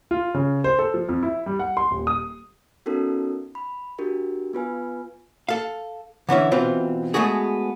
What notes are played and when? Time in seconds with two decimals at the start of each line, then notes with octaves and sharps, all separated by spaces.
0.11 F4
0.34 C#3
0.64 C5
0.79 A4
0.94 F3
1.09 F2
1.23 E4
1.46 G3
1.59 F#5
1.77 C6
1.91 D#1
2.07 D#6
2.86 B3 C#4 D#4 F#4 A4 A#4
3.55 B5
3.98 D4 F#4 G4 A#4
4.53 B3 F4 B4 G#5
5.49 A4 F5
6.29 D3 E3 C#4 E4
6.52 B2 E3 C4 F4
7.14 G#3 A3 B3 F#4 G#4